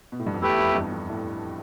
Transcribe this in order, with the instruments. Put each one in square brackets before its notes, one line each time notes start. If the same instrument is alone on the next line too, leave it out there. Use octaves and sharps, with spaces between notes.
[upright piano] B2
A2
G2
F2
[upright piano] E2 [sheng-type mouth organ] A3 E4 G4 B4
[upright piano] F2
E2 G2
F2
A2